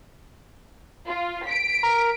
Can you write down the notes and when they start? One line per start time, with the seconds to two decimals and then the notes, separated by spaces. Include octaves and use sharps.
1.08 F4
1.46 B6 D7
1.83 A#4